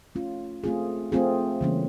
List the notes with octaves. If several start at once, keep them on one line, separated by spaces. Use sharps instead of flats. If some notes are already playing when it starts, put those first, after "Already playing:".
A3 C#4 F4
A3 C4 F4 G#4
A3 C4 F4 G#4
C#3 E3 G3 A#3 C#4